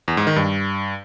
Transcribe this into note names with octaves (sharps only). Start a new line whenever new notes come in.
E2
G#2
D#3
G2